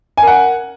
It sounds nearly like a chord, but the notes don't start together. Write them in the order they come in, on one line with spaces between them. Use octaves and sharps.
G#5 A#4 F#5